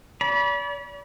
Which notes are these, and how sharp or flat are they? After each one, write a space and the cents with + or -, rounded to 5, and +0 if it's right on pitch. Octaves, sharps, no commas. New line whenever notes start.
D5 -40 B5 -25